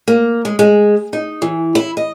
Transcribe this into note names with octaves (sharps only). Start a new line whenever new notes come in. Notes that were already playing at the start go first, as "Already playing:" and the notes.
A#3
G#3
G#3
D#4
E3
E4
D#5